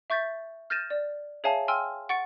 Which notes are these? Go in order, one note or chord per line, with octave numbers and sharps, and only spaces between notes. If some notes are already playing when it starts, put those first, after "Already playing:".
E5 C#6 G6 A6 B6
F6 G6 A6 A#6 D#7 E7
D5
G#4 C#5 E5 F5 G#5 A5
G5 G#5 C6 E6 F6
F#5 C#6 A6 C#7 D7